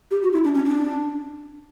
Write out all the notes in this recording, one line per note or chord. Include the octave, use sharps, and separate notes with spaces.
G4
F#4
E4
D4
C#4
D4